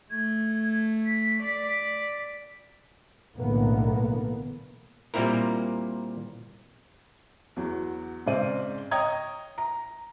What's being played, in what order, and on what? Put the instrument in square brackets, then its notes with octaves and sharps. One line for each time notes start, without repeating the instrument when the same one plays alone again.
[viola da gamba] A3 [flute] G#6
[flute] B6
[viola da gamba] D5
[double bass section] B1 A2 D3 E3 A#3 B3
[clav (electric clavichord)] A#2 G3 A#3 C4 E4 A#4
[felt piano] E2 F#3
G#2 C#3 C4 D5 D#7
C#5 D#5 G5 A#5 D#6 G#6
A#5